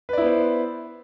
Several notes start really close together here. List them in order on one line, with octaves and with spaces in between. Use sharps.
B4 D5 E4 B3 C5